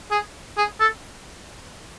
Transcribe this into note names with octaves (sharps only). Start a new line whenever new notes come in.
G#4
G#4
A4